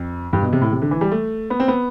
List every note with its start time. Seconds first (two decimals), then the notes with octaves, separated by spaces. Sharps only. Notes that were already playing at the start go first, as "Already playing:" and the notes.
Already playing: F2
0.33 G2
0.42 B2
0.53 C3
0.61 A2
0.72 C3
0.82 D3
0.91 E3
1.01 G3
1.11 A3
1.50 B3
1.60 C4
1.68 B3